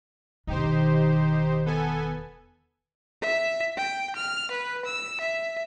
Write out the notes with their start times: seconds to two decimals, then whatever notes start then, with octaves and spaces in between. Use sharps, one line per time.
0.47 E1 D#3 D#4 G4 C5
1.66 B3 A4 G#5
3.22 E5
3.77 G5
4.16 F6
4.51 B4
4.85 E6
5.21 E5